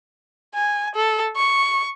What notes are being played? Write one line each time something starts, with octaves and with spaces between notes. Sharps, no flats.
G#5
A4
C#6